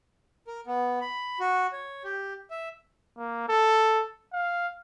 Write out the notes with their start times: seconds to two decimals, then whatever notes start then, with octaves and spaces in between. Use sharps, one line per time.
0.47 A#4
0.67 B3
1.01 B5
1.40 F#4
1.73 C#5
2.04 G4
2.51 E5
3.18 A#3
3.49 A4
4.33 F5